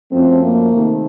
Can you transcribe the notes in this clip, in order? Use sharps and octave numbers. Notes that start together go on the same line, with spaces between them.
F#2 F3 A3 C4
A#3
C3 D#3 A3